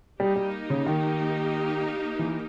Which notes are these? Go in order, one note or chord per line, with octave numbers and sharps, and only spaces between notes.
G3 A#3 D#4 G4
G3
C#3
D#3
E3